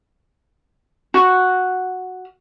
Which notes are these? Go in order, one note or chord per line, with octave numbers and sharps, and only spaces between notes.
F#4